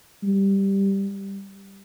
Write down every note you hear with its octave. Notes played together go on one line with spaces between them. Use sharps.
G3